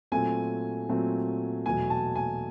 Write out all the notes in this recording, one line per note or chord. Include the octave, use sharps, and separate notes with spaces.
A#2 F#3 A3 C4 G#5
A#2 F#3 A3 C4
E2 B2 F#3 A3 G#5
A5
G#5